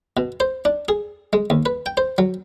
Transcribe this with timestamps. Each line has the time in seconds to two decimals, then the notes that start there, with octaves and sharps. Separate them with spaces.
0.17 B2
0.40 C5
0.65 D4
0.89 G#4
1.33 G#3
1.50 D#2
1.66 B4
1.86 G5
1.97 C5
2.18 F#3